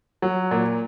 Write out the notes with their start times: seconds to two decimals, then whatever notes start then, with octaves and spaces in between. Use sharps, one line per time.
0.22 F#3
0.51 A#2